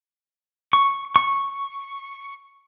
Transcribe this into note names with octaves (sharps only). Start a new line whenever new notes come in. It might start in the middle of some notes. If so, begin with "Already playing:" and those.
C#6
C#6